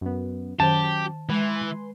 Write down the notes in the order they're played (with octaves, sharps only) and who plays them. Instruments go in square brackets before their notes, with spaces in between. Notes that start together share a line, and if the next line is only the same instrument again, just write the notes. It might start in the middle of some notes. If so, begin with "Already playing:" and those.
[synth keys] F#2 B3
[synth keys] F#2 [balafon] D#3 C5 [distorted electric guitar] G4 [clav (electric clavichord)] A5
[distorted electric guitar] E3 [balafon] G#3 [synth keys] B4 G#5 C6